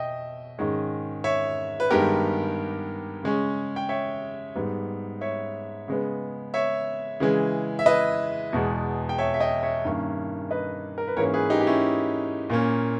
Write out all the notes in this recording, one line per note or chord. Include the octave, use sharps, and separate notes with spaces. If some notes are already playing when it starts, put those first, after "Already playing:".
Already playing: B2 D#5 E5 G5
G#2 D#3 G#3 C#4
C#5 E5
B4
G2 D#3 G#3 B3 G4 A#4
C#3 G#3 C#4
G5
C#5 E5
G#2 G3 B3
C#5 E5
C#3 G#3 B3
C#5 E5
C#3 E3 G#3
E5
B4 D#5
E2 B2 G#3
G5
C#5 E5
E5
D#5 G5
C#5 E5
G2 D#3 A#3 C#4
B4 D#5
A#4
B4
G#2 E3 A#3 C#4 A#4 C#5
G#4 B4
D#4 G4
G4
C#4 E4
A#2 A#3 C#4